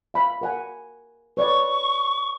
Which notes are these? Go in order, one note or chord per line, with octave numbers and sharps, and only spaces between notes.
F5 B5
A#4 F#5 G#5
B4 C#5 D5 C#6